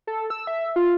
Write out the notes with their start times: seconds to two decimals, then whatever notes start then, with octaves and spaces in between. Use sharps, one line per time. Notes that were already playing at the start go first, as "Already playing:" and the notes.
0.07 A4
0.30 E6
0.47 E5
0.76 F4